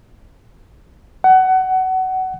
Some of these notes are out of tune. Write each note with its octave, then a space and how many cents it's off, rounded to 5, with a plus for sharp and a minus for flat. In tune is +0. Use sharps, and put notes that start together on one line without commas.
F#5 +20